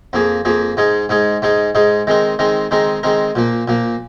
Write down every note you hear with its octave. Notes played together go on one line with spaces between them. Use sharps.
F2 F3 A#3 G#4
F2 F3 A#3 G#4
G#2 G#3 D#4 G#4
G#2 G#3 D#4 G#4
G#2 G#3 D#4 G#4
G#2 G#3 D#4 G#4
D#3 G#3 C4 D#4 A#4
D#3 G#3 C4 D#4 A#4
D#3 G#3 C4 D#4 A#4
D#3 G#3 C4 D#4 A#4
A#2 F3 A#3
A#2 F3 A#3